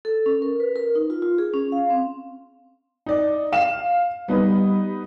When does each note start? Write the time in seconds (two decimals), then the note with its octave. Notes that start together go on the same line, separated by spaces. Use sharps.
0.05 A4
0.26 C#4
0.42 A#4
0.60 B4
0.76 A#4
0.95 D#4
1.10 F4
1.22 F4
1.38 G#4
1.54 C#4
1.72 F5
1.90 C4
3.06 D#4 D5
3.52 F5 E7
4.29 G3 B3 D#4 B4